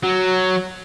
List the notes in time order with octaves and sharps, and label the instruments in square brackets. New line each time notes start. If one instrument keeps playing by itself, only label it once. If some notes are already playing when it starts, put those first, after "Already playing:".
[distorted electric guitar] F#3